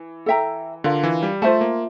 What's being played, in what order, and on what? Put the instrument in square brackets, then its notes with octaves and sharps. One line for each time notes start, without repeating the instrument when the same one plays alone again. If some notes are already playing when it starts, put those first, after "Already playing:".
Already playing: [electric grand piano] E3
[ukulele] A4 E5 G5 A#5
[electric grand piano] D3 [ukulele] D4 F4 A#4 F5
[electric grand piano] E3
G3
[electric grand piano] A3 [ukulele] F4 C5 E5 A5
[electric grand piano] A#3